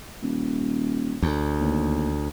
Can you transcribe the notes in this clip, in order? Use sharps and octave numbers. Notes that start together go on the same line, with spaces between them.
D#1
D2
D#2